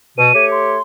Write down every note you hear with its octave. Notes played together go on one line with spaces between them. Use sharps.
B2 D#7
A3 G4 C#5
C6